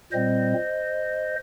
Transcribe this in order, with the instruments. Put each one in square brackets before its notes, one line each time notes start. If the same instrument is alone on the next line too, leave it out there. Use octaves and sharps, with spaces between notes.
[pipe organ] A#2 G3 C4 C5 D#5